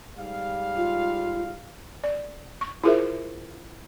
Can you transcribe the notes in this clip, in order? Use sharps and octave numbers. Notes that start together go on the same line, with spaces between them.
G#2 G3 F5
F4
D5
C#6
E4 F4 G#4 A#4 C5 E5